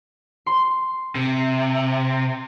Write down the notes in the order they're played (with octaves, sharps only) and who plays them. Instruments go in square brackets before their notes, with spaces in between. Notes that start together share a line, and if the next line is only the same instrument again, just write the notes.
[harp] C6
[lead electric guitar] C3